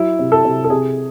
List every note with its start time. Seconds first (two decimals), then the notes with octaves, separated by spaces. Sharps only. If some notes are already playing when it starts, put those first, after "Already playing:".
Already playing: F#3 E4
0.19 C3
0.32 A4
0.45 C3
0.64 A4
0.70 C3 G#4